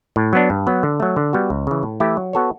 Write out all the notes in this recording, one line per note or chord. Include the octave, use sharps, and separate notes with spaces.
A2
F#3 B3 D4
G2
F#3 B3
D3
F#3 A3
D3
G3 B3 F#4
C#2
C#3 E3
A2
E3 A3 E4 G4
F#3
B3 F#4 A4 C#5